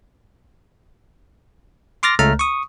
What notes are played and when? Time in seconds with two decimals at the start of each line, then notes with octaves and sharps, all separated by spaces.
2.03 C6 D6 F6 A6 A#6
2.19 C#2 A3 A#5 F6
2.39 C#6 D#6